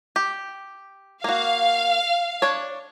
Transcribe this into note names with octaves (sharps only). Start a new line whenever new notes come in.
G4
A#3 F#4 F5
D4 C#5